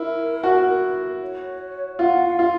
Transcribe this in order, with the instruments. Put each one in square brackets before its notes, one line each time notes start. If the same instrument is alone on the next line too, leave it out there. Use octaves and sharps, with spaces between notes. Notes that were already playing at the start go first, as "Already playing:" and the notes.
Already playing: [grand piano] E4 [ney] A#4
[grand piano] F#4
[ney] C#5
[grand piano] F4 [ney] F#5
[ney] F5
[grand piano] F4